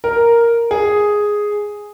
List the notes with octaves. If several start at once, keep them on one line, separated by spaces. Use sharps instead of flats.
A#4
G#4